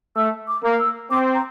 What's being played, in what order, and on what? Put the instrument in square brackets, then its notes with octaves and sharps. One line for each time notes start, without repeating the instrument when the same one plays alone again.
[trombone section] A3 [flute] E6
[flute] D6
[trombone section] A#3
[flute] E6
[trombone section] C4 [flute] D6
[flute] A#5